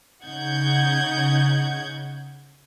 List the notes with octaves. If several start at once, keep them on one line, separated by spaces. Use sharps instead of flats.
C#3 D#4 F#5 G6 G#6